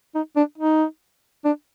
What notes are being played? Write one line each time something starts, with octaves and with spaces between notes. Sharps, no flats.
D#4
D4
D#4
D4